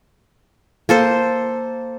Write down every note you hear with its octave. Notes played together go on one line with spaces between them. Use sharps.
A#3 A4 C5